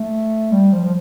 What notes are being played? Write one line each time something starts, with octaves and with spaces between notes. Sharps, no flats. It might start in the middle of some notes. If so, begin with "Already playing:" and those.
Already playing: A3
G3
F3
F3